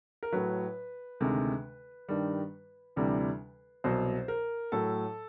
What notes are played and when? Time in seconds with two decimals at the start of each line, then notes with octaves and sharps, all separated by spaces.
0.23 A#4
0.32 A2 F#3 B4
1.20 D2 C3 D#3 G#3
2.09 G2 D#3 G3
2.96 D2 C3 E3 G3
3.84 C2 B2 F#3 C5
4.28 A#4
4.72 A2 F#3 A4